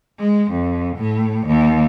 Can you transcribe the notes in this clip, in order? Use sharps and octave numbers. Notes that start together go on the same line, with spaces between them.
G#3
F2
A2
D#2